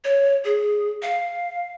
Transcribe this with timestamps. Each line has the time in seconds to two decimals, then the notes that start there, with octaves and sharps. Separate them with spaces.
0.05 C#5
0.45 G#4
1.02 F5